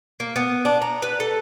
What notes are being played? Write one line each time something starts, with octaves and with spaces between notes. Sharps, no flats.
A#3
B3
D4
A#5
B4
A4